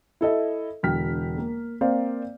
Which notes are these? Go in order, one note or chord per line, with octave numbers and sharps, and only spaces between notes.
E4 A4 D#5 E5
E1 D3 G5 F6 B6
A#3
A#3 C4 C5 D5 F5